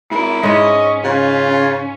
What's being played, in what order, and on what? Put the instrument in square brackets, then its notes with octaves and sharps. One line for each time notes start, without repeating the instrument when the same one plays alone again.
[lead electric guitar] G#2 A#4 [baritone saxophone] E4
[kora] G#2 G#3 [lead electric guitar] C#4 [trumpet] D#5
[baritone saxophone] C#3 [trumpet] F4